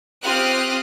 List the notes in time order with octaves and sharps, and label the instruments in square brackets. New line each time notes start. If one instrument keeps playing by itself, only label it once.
[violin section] C4 F4 G4 D#6 F6 F#6